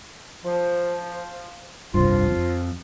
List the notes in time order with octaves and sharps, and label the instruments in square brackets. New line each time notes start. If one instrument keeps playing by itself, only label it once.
[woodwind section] F3
[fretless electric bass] F1 C2 G2 [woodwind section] F3 F4
[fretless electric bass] F2